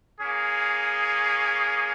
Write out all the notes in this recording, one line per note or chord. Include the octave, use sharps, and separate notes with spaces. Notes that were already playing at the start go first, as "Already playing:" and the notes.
A#3 C#4 G#4